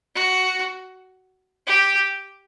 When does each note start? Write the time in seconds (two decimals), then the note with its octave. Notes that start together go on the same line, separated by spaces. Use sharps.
0.15 F#4
1.67 G4